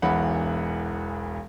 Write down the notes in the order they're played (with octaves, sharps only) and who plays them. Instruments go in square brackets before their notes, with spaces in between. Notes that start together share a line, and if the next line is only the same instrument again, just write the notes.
[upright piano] E1 B1 E3 F#5 B5